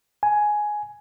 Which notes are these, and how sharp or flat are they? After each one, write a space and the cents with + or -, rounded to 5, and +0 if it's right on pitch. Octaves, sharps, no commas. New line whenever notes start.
G#5 +10